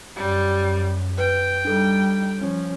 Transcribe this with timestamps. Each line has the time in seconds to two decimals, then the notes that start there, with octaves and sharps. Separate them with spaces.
0.16 F#2 G3
1.18 B4 G5
1.65 G3 D4 D#4 A4
2.38 F3 C#4